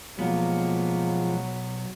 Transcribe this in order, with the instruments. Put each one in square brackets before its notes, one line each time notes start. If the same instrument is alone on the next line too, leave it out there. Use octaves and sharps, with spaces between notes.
[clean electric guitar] B1 B3 [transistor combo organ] F3 G#3 [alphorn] F#3 [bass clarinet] A#3